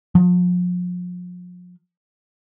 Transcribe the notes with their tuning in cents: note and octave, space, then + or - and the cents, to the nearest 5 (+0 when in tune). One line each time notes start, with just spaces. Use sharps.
F3 +40